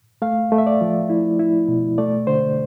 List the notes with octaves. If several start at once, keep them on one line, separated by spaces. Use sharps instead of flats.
A3 F5
A3
E5
D5
F3
E4
E4
B2
A3 D5
D3 C5